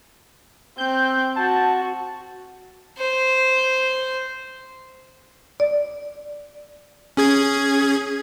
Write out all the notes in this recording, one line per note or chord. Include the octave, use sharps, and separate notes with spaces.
C4 G6
F#4 A5
C5
D5
C#4 G#4 G#6